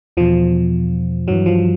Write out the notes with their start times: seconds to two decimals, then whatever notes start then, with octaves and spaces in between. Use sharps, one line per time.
0.17 E2 B2 F3
1.28 G2 E3 F#3
1.46 F3